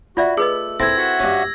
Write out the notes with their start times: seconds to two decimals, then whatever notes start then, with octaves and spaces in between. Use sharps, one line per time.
0.17 F4 F#4 D5 E5 B5
0.37 A3 G#4 B4 D#5 E6
0.80 C4 E4 A4 G#6 A#6
0.97 F#4 E5 F#5
1.20 G2 C#4